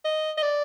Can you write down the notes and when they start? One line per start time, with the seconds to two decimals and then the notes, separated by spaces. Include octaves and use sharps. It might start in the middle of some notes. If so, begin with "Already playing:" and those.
0.04 D#5
0.37 D#5
0.42 D5